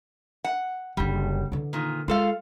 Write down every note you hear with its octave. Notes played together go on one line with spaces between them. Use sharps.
F#5
F#1 D3 G3
D3 E3
A#2 D#3
G#3 F4 A4 F5